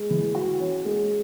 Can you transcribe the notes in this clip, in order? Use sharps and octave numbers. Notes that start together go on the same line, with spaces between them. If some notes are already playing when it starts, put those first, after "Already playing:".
Already playing: G#3
E3
F#4
C#4
G#3